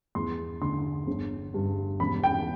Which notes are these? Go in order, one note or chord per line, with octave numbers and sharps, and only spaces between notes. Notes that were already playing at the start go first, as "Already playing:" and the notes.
E2 C6
D3 C6
G1
G2
E1 B5
G5